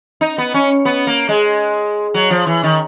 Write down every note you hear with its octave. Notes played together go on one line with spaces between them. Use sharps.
D#4
B3
C#4
B3
A#3
G#3
F#3
F3
E3
D#3